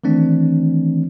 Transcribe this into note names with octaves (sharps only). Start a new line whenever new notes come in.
D#3 E3 A3 C4 D4